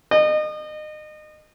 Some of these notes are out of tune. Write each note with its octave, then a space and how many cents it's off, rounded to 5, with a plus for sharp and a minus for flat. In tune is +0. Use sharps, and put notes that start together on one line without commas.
D#5 -30